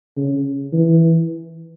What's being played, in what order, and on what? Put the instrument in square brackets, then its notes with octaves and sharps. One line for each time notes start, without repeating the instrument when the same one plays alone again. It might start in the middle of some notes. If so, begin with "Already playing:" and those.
[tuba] C#3
E3